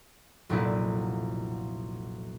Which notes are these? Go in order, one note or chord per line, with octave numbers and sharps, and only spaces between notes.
F1 B1 A#2 D4 E4